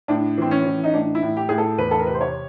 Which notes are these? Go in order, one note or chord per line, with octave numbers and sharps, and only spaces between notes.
A2 D4
E3 C4
C#4
E3
D#4
A2 D4
E4
A2
G4
A2 G#4
A4
E2 B4
A4
A#4
C3 B4
C5
C#5